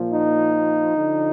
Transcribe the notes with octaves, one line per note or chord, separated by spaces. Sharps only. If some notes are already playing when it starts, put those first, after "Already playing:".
Already playing: A#2 F3
D#4
D3 F3